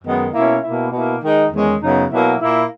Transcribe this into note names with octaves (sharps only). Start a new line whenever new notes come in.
F#2 D#3 G#3 B3
B2 A#3 C#4 E4
B2 A#3 E4
B2 A#3 E4
D#3 G#3 D#4
E2 D#3 G#3 C#4
F#2 C#3 F#3 B3 D#4
B2 F#3 A#3 E4
A#2 A#3 E4